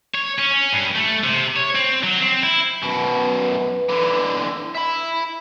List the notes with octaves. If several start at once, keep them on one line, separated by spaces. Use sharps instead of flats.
C#5
C#4
G2
A3
C3
C#5
C4
F#3
C4
E4
F#2 B2 B4
D3 E3
E5 B5